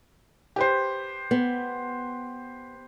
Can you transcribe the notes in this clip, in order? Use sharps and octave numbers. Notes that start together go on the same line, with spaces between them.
G4 B4 C5
B3